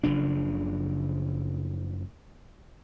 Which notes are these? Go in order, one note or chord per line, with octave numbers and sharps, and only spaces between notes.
F#1 C#3 F3 D4